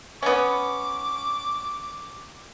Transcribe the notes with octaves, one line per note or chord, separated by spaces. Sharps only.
B3 C#4 D6